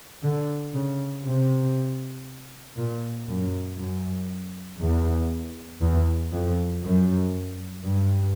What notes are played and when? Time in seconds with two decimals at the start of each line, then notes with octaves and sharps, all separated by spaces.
0.23 D3
0.74 C#3
1.25 C3
2.77 A#2
3.28 F#2
3.78 F#2
4.80 E2
5.82 E2
6.33 F2
6.84 F#2
7.85 G2